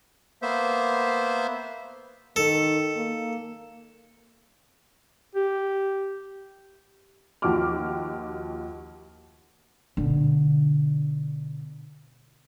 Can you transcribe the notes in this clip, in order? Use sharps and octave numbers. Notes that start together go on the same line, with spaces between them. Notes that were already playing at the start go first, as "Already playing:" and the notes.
A#3 B3 C5 E5
D#3 A4
A#3
G4
D#2 F3 F#4 G5 D6 F6
B2 D3